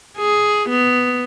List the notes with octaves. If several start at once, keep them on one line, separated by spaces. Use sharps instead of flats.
G#4
B3